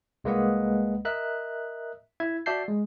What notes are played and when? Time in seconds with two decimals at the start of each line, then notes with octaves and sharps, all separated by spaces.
0.24 C2 G#3 A#3 B4 D#5 F#5
1.05 A#4 D#5 E5 F#6
2.20 E4 E5 G#6
2.46 F#4 D5 E5 A5 G6 C7
2.68 G#3